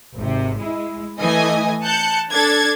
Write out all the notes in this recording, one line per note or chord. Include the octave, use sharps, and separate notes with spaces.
G#1 C3
G#3 E4
E3 A3 D#5 G#5
A5 F#6 G6 C#7
D4 A4 G#6 A6